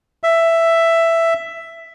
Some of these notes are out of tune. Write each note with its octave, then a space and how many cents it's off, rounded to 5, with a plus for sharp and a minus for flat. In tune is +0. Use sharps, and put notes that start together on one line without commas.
E5 +10